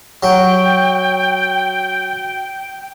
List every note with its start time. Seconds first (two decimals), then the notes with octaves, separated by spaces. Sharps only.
0.23 F#3 G5